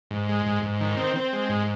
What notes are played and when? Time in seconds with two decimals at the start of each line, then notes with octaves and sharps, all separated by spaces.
0.11 G#2
0.29 G#3
0.46 G#2
0.63 G#2
0.80 D#3
0.97 C4
1.16 C4
1.33 G#3
1.49 G#2